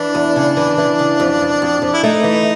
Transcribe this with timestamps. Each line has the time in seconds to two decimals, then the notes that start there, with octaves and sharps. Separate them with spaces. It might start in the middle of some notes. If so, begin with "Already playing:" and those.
Already playing: E3 D4
0.15 E2
0.36 C#3
0.57 E3
0.78 E3
0.99 C#3
1.20 F2
1.41 F2
1.62 F2
1.82 F2
1.93 E4
2.03 A3 D#4
2.24 E3